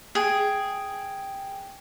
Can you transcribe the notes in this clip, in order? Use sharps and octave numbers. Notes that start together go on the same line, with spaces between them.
G#4 G5